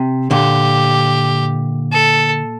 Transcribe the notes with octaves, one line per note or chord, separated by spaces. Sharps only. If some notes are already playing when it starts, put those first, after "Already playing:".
Already playing: C3
A#2 D3 G4
A4